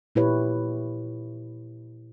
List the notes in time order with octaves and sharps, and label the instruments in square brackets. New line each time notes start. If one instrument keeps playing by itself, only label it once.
[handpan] A#2 E4 G4 B4 C#5